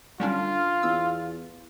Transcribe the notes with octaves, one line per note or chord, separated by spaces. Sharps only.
D3 G3 C#4 D4 F4
E2 E6